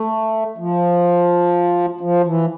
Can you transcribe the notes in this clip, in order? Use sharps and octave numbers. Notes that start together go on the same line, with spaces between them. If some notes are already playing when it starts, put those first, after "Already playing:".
Already playing: A3
F3
F3
E3